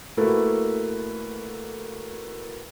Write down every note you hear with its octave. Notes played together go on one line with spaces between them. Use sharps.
A3 A#3 E4 F#4 A4 B4